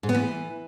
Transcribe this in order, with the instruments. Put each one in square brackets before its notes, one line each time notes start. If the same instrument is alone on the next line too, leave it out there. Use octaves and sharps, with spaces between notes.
[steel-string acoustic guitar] G#2
B3
E3